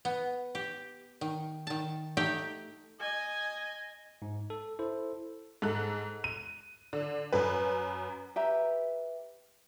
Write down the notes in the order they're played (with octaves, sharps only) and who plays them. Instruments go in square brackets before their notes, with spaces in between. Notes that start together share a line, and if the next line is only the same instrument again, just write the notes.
[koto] B3
G4
D#3
D#3 A5
A3 D#4 G4 G5
[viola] D#5 G#5
[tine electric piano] G#2
A4
E4 A4 C5
[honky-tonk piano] G#2 A4 F#6
D#7
D3
F#2 B4
[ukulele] G4 B4 E5 A#5